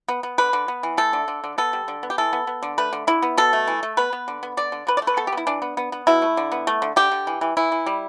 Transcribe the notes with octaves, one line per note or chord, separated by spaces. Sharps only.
B3
B3
D3 B4
D3
B3
E3
A3 A4
D3
D3
D3
B3 A4
G3
D3
B3
G4
E3 A4
B3
B3
D3
A3 B4
D3
D3 E4
B3
B2 A4
A3
E3
A3
B3 B4
B3
D3
B3
D3 D5
D3
D3 B4
D5
A3
B4
B3 A4
G4
B3 E4
E3 D4
B3
B3
B3
B2 E4
A3
D3
B3
A3
D3
D3 G4
D3
E3
E3
E3 E4
E3
G3